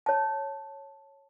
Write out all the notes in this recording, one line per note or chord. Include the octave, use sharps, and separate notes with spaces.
C#5 A5